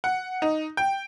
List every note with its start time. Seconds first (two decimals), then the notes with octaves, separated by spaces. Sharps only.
0.04 F#5
0.42 D#4
0.77 G5